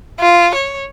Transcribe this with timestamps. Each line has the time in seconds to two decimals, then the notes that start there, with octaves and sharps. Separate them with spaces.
0.20 F4
0.55 C#5